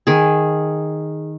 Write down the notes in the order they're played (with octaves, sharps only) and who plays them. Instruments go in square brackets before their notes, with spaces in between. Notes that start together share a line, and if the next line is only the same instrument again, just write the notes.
[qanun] D#3 G#4